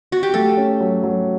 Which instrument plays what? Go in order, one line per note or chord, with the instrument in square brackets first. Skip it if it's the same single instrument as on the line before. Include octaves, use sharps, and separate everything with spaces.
[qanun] F#4
G4
[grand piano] A3 [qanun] A4
[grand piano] C#4
F#3
F#3